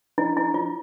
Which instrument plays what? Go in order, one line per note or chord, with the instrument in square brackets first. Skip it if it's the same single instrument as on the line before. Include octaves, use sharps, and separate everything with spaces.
[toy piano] E4
E4
F4